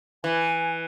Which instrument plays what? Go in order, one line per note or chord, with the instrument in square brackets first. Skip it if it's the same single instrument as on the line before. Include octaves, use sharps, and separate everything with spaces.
[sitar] E3 [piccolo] G#5